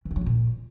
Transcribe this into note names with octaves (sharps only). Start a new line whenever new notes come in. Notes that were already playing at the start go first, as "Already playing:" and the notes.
E3
A3
F#3
F#2
A#2